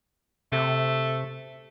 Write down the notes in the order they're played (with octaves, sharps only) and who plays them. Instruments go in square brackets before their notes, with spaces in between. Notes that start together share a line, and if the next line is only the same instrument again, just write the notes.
[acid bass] C3 [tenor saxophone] A3